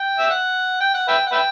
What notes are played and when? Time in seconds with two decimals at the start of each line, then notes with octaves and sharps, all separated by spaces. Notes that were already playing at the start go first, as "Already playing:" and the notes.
Already playing: G5
0.18 E5
0.30 F#5
0.80 G5
0.94 F#5
1.08 B4 E5 G5
1.27 F#5
1.32 B4 E5 G5